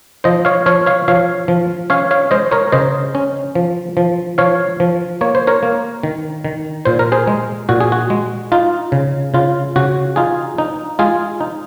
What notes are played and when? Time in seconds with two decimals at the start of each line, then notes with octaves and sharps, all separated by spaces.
0.24 F3 C5 D#5
0.45 C#5 F5
0.66 F3 C#5 F5
0.86 C#5 F5
1.08 F3 C#5 F5
1.48 F3
1.90 C#4 C#5 F5
2.11 C#5 F5
2.31 G#3 C5 D#5
2.51 A#4 C#5
2.72 C#3 C5 D#5
3.15 C#4
3.55 F3
3.97 F3
4.38 F3 C#5 F5
4.80 F3
5.21 A#3 C#5
5.35 C5
5.47 A#4 C#5
5.63 A#3
6.03 D#3
6.45 D#3
6.85 A#2 C5
6.99 A#4
7.12 G#4 C5
7.27 G#3
7.69 A#2 F#4
7.80 G#4
7.92 F#4
8.10 G#3
8.52 D#4 F4
8.92 C#3
9.34 C#3 F4
9.76 C#3 F#4
10.16 D#4 F4 G#4
10.58 D#4
10.99 G#3 F4 G#4
11.41 D#4